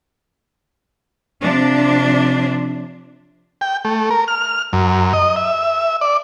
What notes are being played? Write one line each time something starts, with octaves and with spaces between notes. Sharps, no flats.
C3 F3 D4
G5
A3
A#4
F6
F#2
D#5
E5
D5